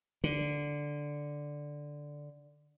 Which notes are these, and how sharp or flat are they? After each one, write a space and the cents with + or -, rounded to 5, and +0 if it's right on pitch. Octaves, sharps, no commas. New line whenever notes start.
D3 +0